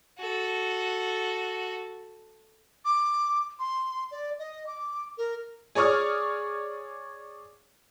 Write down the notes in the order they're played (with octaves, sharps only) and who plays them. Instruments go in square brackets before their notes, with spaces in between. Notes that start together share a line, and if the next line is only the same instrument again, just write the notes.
[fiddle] F#4 A4
[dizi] D6
C6
D5
D#5
D6
A#4
[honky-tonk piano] G#4 C#5 D5 C#6 D#6 F6